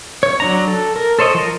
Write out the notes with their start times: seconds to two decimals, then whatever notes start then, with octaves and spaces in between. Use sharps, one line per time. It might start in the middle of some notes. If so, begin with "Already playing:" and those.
0.23 C#5
0.40 F#3 D4 A#5
0.68 A4
0.96 A#4
1.19 A4 C5 C#5 D#5
1.35 F3 A#4